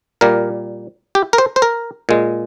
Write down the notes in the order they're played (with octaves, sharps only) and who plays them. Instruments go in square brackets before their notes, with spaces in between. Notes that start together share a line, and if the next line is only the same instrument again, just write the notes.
[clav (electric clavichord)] A#2 G3 A#3 A#4
G4
A#4
C5
C5
A#4
A#2 G#3